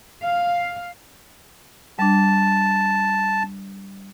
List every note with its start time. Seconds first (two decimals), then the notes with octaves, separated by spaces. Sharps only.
0.24 F5
1.99 G3 D4 A5